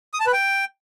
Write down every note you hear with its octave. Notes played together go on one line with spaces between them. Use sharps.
D#6
A5
B4
G5